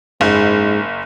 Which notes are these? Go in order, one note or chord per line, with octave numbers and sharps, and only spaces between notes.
F#1 G#2